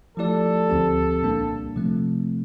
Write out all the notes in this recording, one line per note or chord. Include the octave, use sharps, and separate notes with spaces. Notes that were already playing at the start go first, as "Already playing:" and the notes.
F3 A3 E4 G4 A4 D5
D2 D3 F3 C4 G4
C2 A#2 G3 A#3 D4
C3 F3 A3 C4